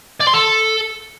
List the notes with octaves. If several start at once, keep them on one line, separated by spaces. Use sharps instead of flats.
D5
C6
A4